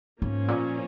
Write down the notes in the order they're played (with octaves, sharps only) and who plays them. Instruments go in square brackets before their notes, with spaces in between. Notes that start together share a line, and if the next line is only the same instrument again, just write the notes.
[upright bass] G#2 [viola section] F3 A#3 C#4
[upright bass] A#2